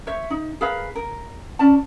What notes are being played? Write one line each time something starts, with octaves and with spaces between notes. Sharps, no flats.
C5 C#5 E5
D#4
G#4 A#4 B4 F5
A#4
C#4 D5 A5